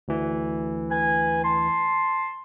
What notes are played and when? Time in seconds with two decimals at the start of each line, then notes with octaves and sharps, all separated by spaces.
0.08 D2 E3
0.90 B4 G#5
1.44 A5 C6